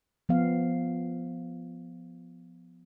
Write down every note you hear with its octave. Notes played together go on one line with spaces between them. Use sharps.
F3 B3 F5